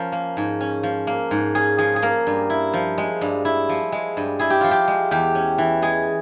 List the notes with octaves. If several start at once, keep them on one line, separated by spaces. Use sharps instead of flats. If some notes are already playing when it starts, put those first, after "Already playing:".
Already playing: F3 C#4 A#4
A#3
G#2
C#4
F3
A#3
G#2
C#4 G#4
F3 G#4
G#4
A#3 A#4
G2
E4
F3
G#3
G2
E4
F3
G#3
G2
E4 G#4
G4
F3 F4
G4
G#3
E2 G4
C#4
E3
G#3 G#4